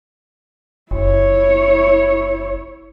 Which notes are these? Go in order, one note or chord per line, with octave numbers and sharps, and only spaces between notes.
F#1 E4 C#5